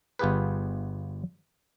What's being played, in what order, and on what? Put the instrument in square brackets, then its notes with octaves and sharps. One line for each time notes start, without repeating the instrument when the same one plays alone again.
[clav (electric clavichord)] G1 B3 F4 G4 G#4 B4